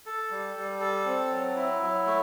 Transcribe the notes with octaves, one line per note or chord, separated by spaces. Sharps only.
A4
G3
G3
A4
C4
F#3
E4
F#3
A3